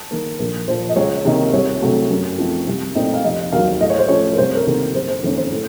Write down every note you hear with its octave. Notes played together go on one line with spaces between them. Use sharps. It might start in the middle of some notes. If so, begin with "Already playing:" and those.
Already playing: A5
D#3 A#3 A#4
A#1 A#4
A#2 F3 C5
D#5
C#2 C#5
C3 D#3 A#3 D#4
C2 C#5
C3 F#3 A3
F#2
F3 A3 C4 D#4
C2
A#2 A3 C4 D#4
F5
F1 D#5
D#2 D#3 F#3 F5
A2 D#5
C#5
C5
F3 A3 C#4 C#5
A#4
C2 C5
A#4
C3 D#3 A#3 A4
F#1 C5
C5
F2 D#3 A#3 C#4 A#4
C5
A2